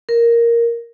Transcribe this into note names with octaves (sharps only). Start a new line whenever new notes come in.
A#4